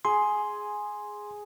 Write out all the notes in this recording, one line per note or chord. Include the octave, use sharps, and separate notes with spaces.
G#4 C6